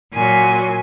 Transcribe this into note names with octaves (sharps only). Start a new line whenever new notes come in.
A#2 F#3 G#5